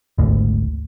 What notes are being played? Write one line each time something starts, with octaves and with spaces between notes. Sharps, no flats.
G#1 D2